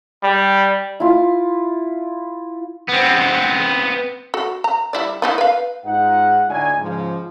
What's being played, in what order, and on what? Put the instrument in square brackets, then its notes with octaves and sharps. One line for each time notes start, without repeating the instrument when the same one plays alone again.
[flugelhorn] G3
[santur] E4 F4
[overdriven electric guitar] B3 C4
[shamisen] F#4 A4
A#5
G3 E4 D5
B3 D#4 E4
B4 F5
[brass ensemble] G#2 D#4 F4 F#5
D2 A2 D#4 D5 G#5
G#2 C#3 F3